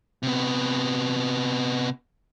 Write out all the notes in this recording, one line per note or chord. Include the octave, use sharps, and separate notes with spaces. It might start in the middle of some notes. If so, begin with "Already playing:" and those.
C3 B3